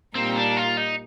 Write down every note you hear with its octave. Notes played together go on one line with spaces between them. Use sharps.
A#2 G3 A#3 C4 D#4
D4
F4
D#4